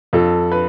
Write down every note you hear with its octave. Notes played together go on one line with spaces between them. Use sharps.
F2 A4
B4